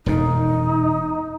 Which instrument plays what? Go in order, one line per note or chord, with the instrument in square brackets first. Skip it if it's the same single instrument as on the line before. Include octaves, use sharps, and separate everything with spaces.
[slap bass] E1 F2 A#2 [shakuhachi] D#4